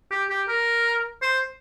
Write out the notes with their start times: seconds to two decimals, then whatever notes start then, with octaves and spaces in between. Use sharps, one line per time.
0.11 G4
0.30 G4
0.48 A#4
1.22 C5